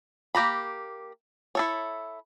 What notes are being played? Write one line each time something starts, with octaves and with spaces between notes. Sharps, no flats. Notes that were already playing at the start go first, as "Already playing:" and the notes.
A#3 G4 A#5 B5
E4 A4 C#5